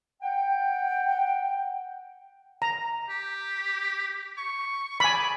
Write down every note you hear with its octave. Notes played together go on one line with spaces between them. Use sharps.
F#5 G5
A#5
G4
C#6
D5 G#5 B5